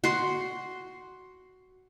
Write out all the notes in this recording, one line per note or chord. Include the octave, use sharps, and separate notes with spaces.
F#4 C6